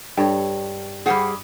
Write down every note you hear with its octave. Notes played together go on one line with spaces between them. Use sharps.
G2 A4 C#5 G5
G3 G4 G#4 C5 F5 F#5